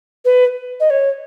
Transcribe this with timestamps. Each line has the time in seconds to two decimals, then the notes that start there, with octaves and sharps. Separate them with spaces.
0.25 B4
0.80 D#5
0.90 C#5